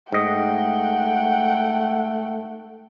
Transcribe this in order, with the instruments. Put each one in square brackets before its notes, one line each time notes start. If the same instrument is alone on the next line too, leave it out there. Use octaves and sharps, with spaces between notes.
[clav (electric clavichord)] G#2 D#5 [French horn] A3 [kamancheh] F#5 G5